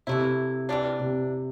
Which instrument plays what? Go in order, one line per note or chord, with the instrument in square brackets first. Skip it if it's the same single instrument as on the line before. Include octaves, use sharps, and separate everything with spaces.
[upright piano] C3 [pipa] E3 A3 E4
[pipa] E3 G3 D4
[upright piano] C3